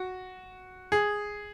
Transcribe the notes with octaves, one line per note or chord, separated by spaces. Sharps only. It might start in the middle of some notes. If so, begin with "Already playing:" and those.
Already playing: F#4
G#4